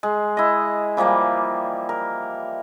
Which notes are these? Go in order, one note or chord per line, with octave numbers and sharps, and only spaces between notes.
G#3
E4 D#5
E3 F3 G3 A#3
A#4